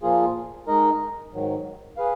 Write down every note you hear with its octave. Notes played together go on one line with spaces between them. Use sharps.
A#2 F3 A#3 F4 G#4
G#3 D#4 A#4 D#5
G#2 D#3 F#3
G#4 B4 F5